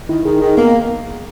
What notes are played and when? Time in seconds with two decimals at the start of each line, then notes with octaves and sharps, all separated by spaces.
0.09 D#3 E4
0.25 D#3 G#4
0.41 D#3 G#4
0.58 A#3 B3